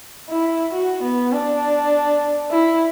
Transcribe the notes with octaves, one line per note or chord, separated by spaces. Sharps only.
E4
F#4
B3
D4
E4